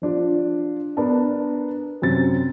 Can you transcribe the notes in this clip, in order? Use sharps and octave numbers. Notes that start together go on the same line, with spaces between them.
F3 D4 F4
B3 D4 A#4 A5
F#2 C3 A6